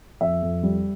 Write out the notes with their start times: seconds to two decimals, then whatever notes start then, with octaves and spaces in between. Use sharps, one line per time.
0.21 F2 E5
0.42 F2
0.63 G3